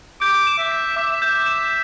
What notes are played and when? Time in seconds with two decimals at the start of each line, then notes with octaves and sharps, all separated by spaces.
0.21 D6 G6
0.47 E7
0.59 E5
0.72 B6
0.97 E5 D6
1.22 G6
1.46 E7